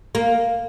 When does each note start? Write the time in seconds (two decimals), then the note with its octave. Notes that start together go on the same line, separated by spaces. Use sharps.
0.15 A#3